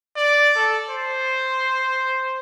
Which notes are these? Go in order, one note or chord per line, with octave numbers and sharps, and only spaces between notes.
D5
A4
C5